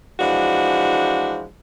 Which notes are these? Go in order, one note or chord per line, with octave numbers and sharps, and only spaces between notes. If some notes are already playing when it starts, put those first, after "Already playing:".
E3 F3 G#3 D4 F#4